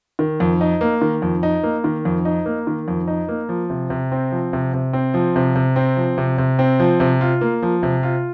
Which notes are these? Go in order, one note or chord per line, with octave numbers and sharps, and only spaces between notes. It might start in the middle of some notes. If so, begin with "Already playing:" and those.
D#3
F2
D#4
A#3
D#3
F2
D#4
A#3
D#3
F2
D#4
A#3
D#3
F2
D#4
A#3
F3
C3
C3
C4
F3
C3
C3
C4
F3
C3
C3
C4
F3
C3
C3
C4
F3
C3
F4
A#3
F3
C3
F4